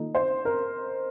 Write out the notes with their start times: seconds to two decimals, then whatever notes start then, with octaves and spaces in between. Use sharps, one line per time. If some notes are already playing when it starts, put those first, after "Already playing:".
Already playing: D#3 A#3 D#4 F4 A4
0.15 C5
0.45 A#4